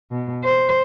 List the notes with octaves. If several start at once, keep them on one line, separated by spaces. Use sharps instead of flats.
B2
C5